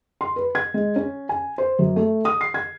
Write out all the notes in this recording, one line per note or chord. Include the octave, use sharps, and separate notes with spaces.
C6
B4
G#6
G#3
C#4
G#5
C5
F#2
A3
D#6
C7
G#6